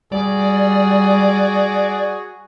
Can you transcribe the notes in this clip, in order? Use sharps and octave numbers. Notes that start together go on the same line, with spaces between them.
G3 F#4 G#4 D5